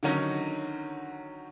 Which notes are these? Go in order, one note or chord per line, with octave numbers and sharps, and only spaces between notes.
D3 D#3 F#3 C#4 D#4